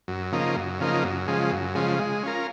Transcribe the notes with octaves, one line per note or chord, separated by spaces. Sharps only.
F#2
C#3 F3 A#3 D#4
F#2
C#3 F3 A#3 D#4
F#2
C#3 F3 G#3
F#2
C#3 F3 G#3
G#3
C#4 F4 A#4